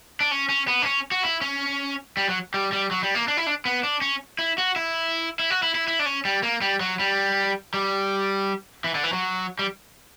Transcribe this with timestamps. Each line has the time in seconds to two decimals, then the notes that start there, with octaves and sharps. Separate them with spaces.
0.20 D4
0.31 C#4
0.49 C#4
0.68 B3
0.82 D4
0.86 C#4
1.11 F#4
1.23 E4
1.41 C#4
2.17 G3
2.29 F#3
2.54 G3
2.72 G3
2.91 F#3
3.03 G3
3.15 A#3
3.28 D4
3.37 E4
3.47 D4
3.65 B3
3.83 D4
4.01 C#4
4.39 E4
4.58 F#4
4.76 E4
5.39 E4
5.50 F#4
5.63 E4
5.75 E4
5.88 E4
5.99 D4
6.06 C#4
6.25 G3
6.43 A#3
6.61 G3
6.80 F#3
6.99 G3
7.74 G3
8.84 E3
8.95 D3
9.04 E3
9.13 F#3
9.59 G3